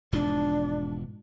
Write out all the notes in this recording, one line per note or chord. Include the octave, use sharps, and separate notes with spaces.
E1 G#2 F3 D4